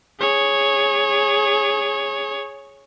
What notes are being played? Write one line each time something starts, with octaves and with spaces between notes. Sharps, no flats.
G#4 C#5